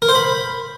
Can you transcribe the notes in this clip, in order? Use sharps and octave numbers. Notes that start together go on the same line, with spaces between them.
A#4
C5
B5